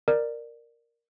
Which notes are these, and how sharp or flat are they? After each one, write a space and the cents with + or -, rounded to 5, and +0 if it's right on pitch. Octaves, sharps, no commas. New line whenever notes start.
A#4 +0 D5 +20